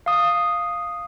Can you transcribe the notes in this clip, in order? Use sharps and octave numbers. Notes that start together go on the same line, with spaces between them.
F5 D#6